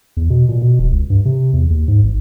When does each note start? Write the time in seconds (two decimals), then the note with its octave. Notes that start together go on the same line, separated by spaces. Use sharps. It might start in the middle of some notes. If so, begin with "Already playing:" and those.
0.17 E2
0.30 B2
0.49 A#2
0.62 B2
0.79 D#1
0.92 C#2
1.10 G2
1.25 C3
1.53 E2
1.70 D#2
1.88 G#2
2.03 G#1